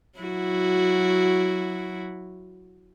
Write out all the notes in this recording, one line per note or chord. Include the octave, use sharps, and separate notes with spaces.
F#3 E4 F#4